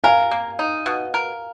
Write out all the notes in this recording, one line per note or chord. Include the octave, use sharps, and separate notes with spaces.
A#4 F5 G#5
A#3
D#4
B2
A#4